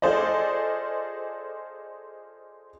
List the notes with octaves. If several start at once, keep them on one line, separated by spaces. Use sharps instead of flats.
F4 G#4 A4 C5 D5 D#5